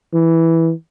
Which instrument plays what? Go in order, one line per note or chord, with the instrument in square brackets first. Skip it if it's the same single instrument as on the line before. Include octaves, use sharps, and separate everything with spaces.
[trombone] E3